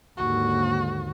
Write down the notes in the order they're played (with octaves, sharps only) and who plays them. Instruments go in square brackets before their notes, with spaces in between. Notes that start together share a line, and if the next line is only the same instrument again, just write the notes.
[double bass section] D#2 G#2 D3 [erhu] F#4